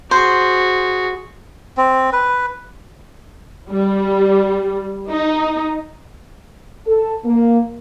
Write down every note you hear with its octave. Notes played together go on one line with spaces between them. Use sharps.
F#4 G#4 C5
C4
B4
G3
D#4
A4
A#3